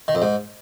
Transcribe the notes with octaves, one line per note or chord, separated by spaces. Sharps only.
D#3
F2
G#2